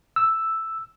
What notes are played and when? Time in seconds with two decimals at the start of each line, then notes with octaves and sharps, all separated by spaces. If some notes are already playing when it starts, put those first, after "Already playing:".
0.16 E6